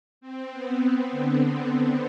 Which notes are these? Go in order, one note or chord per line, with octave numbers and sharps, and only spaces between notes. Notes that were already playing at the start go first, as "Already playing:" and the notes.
C4
B3
B3
D3